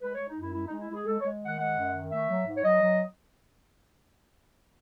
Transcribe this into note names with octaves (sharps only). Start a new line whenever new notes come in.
G#3 B4
G#3 C#5
D#4
F#2 E4
G#3 E4
D#4
G#3
E4
G#3
G#4
G#3 A4
C#5
G#3
D#3 F#5
G#3 F#5
F#2
D#3
A3 E5
F#3
G#2
C#5
F#3 D#5
F#3